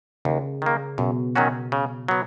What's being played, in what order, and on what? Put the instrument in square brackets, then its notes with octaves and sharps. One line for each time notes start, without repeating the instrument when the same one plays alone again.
[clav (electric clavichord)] D#2 [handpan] C#3
[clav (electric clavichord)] D#3 A#3
[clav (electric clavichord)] F#2 [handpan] B2
[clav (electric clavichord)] D#3 F#3 C#4 F#4
C#3
F#3 B3